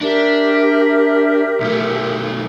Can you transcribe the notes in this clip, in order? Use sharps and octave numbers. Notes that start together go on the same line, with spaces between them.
D4 G4 A#4 E5
B1 A3